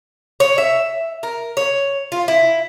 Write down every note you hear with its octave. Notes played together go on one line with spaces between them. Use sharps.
C#5
E5
A#4
C#5
F4
E4